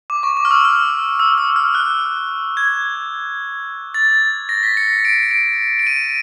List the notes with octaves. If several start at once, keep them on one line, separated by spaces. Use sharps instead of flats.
D6
C#6
D6
F6
E6
F6
E6
E6
F6
F#6
G#6
A6
A#6
B6
C#7
D7
D7
D7
D#7